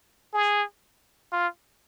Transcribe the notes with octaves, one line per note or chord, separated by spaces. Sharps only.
G#4
F4